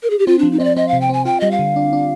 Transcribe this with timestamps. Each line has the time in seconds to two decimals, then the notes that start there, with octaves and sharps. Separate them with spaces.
0.03 A#4
0.10 G#4
0.19 G4
0.27 C4 F4
0.39 F3 D4
0.52 D#4
0.60 C4 D5 D#5
0.76 C4 D#5
0.88 C3 F5
1.01 G5
1.09 C4 G#5
1.25 F4 G5
1.40 G3 D#5
1.51 F5
1.59 D3
1.76 D4
1.93 D4